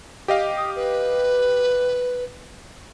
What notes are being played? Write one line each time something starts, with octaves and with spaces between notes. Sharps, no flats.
G4 D#5 F5
D#6
B4